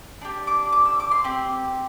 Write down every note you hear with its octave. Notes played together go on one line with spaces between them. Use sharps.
D4 G4
D6
D6
E6
D6
C6
C4 G4